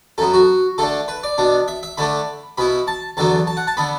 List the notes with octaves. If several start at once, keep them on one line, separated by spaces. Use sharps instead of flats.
F#2 F#3 B3 A4
F#4
D3 A3 D4 A4
B4
D5
B2 B3 D4
E5
E5
D3 A3 D4 B5
B2 B3 E4 B5
A5
E2 D3 F#3 B3 A5
A5
F#5
A5
D3 B3 B5